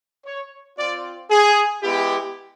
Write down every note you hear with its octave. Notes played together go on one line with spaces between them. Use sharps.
C#5
C4 F4 D5
G#4
G#3 B3 E4 G4